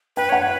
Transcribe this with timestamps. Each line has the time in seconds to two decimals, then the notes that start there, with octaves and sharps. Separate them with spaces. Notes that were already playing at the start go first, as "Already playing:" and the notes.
0.17 B4 G5
0.29 C#5 F#5
0.42 B4